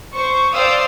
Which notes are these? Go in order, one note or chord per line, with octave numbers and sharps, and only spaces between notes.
C5 C#6
C5 D5 F5 G5 D#6 E6